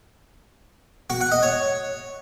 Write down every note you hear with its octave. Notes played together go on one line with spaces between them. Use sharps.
F#4
F#5
D#5
C#5